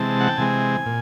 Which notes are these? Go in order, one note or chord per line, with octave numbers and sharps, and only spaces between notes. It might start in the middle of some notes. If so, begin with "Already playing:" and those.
Already playing: C3 E3 G#3 C4 A5
F#5
G5
C3 E3 G#3 C4 G#5
A#2